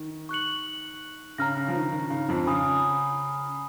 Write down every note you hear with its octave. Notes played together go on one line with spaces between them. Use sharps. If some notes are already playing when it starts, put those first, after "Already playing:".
Already playing: D#3
C#6 F#6 C#7 F#7
C#3 A#5 F6 A#6
C#3
F3
D#3
D#3
C#3
F2 F3
C#3 G#5 B5 D#6